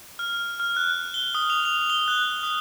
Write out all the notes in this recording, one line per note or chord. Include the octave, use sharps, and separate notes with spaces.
F6
F6
F#6
G7
D#6
F7
F7
G7
F#6
D#6